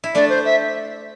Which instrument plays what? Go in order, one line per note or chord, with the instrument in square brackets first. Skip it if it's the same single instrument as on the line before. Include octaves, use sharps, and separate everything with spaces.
[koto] E4
[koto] A3 D4 [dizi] D5
[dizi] C5
E5